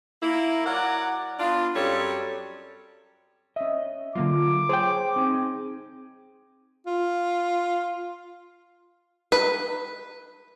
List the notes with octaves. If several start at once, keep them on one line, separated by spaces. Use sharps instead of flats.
A#3 E4
F#3 A#4 D5 F#5
B3 D4 F4
F#2 G3 C4 A4 C#5
C#4 D#5 E5
D3 F#3 A#3 F4 D6
G#4 C5 C#5 G5 A5
C4 D#4 G#5
F4
B4